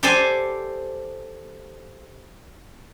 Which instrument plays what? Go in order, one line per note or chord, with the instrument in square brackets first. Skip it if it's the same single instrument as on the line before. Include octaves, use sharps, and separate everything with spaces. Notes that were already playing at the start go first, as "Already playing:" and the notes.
[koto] G4 A4 C5 D5 G5 G#5